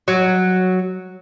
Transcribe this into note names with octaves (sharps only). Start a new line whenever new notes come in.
F#3